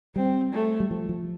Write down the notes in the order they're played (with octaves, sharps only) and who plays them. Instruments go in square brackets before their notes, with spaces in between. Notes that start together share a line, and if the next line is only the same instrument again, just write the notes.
[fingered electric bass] G3 [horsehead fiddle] C4
[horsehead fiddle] A3
[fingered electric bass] G3
F3
F3